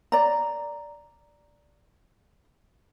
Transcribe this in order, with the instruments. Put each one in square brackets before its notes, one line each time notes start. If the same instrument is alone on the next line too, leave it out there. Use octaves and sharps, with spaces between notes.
[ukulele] D5 A#5